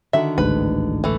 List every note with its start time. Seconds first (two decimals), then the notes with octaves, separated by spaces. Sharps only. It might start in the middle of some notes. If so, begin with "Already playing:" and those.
0.13 D3 D#3 F#4 E5
0.38 A1 D2 G#2 B4
1.04 E3 A3